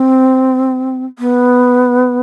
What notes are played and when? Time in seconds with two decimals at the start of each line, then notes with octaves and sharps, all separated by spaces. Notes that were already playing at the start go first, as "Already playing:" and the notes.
Already playing: C4
1.19 B3